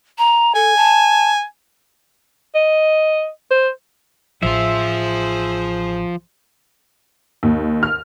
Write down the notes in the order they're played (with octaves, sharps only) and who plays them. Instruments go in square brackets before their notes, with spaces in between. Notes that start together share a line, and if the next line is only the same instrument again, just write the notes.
[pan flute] A#5
[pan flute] A4 [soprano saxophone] G#5
[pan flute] A5
[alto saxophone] D#5
C5
[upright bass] A1 [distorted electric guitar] F3 F4 [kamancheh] G#4 C5 [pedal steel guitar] E5
[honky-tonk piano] D#2
F6